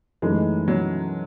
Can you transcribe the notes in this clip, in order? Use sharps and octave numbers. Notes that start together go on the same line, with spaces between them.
F#2 E3 G#3 A3 D#4
F#3